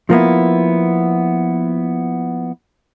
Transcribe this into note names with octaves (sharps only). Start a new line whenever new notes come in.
F3 A#3 B3 E4